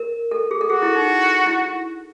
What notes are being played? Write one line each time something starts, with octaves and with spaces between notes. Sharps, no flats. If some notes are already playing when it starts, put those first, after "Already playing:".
Already playing: A#4
A4
G#4
A4
F#4 G#4
E4
D#4
E4